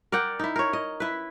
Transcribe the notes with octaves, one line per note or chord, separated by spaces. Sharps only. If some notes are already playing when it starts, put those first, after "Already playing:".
A#4 D5 F#5 G5
D#4 E4
A#4 C#5
D#5
E4 B4